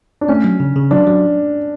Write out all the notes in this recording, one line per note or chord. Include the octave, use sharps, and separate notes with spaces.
D4
A3 C#4
F#3
C#3
C#3
F#3 D4
F#3